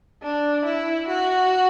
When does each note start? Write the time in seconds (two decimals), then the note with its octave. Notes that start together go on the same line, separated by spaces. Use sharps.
0.22 D4
0.65 E4
1.08 F#4